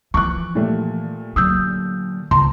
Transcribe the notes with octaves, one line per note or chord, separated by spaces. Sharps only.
E3 F3 C#6 D6 F#6
A#2 G3 A3
D3 F#3 D#6 E6 G6
C#2 A5 A#5 C6